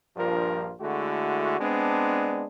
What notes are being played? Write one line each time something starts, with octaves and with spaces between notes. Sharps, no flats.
A#1 G2 F3 D4 F4 A#4
D3 G#3 A3 E4 F#4
G#3 B3 C4 D4